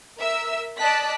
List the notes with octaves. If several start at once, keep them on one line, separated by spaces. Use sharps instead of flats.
A#4 E5 E6
D5 D#5 A5 F#6 B6